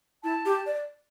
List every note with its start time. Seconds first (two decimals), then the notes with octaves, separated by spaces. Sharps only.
0.24 E4 A5
0.46 G4
0.66 D5